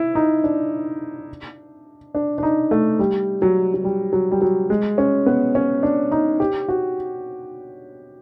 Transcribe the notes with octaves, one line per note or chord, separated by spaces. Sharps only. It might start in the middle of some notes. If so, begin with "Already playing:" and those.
Already playing: E4
D#4
D4
D4
D4
D#4
A3
G3
F#3
F#3
G3
F#3
G3
F#3
G#3
C#4
B3
C#4
D4
D#4
G4
F#4